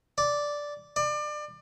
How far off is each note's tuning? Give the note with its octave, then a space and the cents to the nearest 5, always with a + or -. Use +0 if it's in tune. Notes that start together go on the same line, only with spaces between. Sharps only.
D5 -5
D5 +30